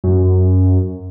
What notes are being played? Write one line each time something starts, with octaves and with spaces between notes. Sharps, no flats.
F#2